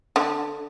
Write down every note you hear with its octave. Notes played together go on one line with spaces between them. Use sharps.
D3